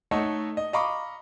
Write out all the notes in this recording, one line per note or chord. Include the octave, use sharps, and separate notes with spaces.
A3 D#4 A4 C#5 D#5 F#5
D#5
D#5 F5 A#5 B5 C#6 D6